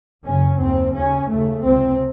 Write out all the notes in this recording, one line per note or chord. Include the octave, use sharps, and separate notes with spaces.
F#1 F#2 C#3 C#4
D#2 C#3 C4
D#2 C#3 C#4
D#2 C#3 A3
C#2 C3 C4